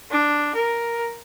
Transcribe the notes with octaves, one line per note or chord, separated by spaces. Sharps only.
D4
A#4